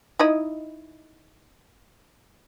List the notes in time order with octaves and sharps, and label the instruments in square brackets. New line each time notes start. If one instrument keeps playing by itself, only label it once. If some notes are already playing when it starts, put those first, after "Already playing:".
[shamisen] D#4 E4 D#5